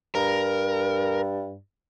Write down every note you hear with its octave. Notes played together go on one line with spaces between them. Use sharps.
G2 A#4